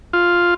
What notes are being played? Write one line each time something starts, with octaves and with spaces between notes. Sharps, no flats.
F4